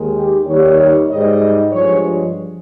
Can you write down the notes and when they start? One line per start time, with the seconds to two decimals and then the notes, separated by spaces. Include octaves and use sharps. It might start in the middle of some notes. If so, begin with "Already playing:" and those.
Already playing: D#2 D#3 G#3
0.16 G4
0.47 D#2 D#3 G3 C#5
1.10 G#2 G3 D#5
1.73 G2 F3 G#3 C#5